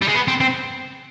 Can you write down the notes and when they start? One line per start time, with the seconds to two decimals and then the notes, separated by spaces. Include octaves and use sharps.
0.02 G3
0.08 G#3
0.15 B3
0.28 C4
0.41 C4